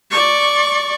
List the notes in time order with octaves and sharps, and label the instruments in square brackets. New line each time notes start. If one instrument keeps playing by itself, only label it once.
[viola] D5 C#6